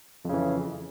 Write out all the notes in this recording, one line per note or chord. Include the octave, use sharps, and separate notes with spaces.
F2 C#3 E3